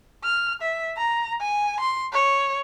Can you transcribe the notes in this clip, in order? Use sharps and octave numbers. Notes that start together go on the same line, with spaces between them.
F6
E5
A#5
G#5
C6
C#5